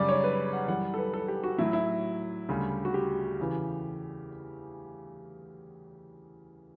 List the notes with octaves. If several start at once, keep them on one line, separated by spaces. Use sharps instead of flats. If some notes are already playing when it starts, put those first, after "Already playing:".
Already playing: F#2 C#3 G3 D5
C#5
B4
F#5
F#2 E3 G3 F#5
A4
B4
A4
G4
F#4
A2 F#3 E4
E4
D2 C#3 G3
F#4
G4
E2 C#3 E3